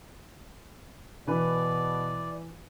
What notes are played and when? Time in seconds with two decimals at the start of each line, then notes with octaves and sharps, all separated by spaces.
1.27 B2 E3 B4 D5